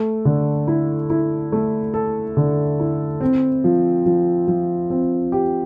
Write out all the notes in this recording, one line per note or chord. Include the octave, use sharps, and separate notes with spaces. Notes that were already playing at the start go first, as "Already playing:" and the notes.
Already playing: A3
D3
E4
E4
A3
A4
D3
E4
C4
F3
F3
F3
C4
G4